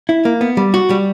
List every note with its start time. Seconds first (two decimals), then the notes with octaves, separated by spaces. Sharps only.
0.09 E4
0.25 A#3
0.41 B3
0.57 G3
0.74 F#4
0.90 G3